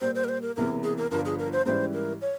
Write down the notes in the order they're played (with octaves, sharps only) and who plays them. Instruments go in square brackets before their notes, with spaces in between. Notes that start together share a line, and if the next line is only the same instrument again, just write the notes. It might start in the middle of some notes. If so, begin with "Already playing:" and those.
[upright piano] A#2 G3 A#3 [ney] C5
[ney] C5
A#4
C5
A#4
[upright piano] E1 E2 C3 E3 A#3 [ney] A#4
[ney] G#4
A#4
[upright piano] G1 G2 F3 [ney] A#4
[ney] G#4
A#4
C5
[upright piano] G#2 E3 G3 C#4 E4 [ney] C5
[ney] A#4
C#5